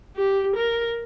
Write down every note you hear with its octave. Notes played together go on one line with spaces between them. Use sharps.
G4
A#4